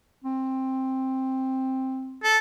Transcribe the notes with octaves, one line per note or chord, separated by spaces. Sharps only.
C4
A4